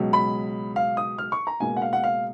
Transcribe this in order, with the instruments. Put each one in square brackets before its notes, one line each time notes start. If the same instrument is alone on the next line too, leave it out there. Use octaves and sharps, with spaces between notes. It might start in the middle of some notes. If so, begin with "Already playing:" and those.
Already playing: [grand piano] C#2 B2 F#3
B5
F5
D#6
F6
C#6
A#5
C#2 B2 A#3 G#5
F#5
F5
F#5
F5